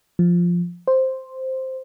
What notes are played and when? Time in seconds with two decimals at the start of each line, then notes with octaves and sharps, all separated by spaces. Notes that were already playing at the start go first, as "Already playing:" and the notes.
0.19 F3
0.88 C5